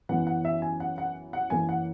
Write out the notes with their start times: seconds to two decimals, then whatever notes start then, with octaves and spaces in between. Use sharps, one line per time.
0.09 F#2 E3 B3 F#5
0.27 F#5
0.45 E5
0.62 G#5
0.80 F#5
0.98 F#5
1.33 F#5
1.50 F#2 E3 A#3 G#5
1.69 F#5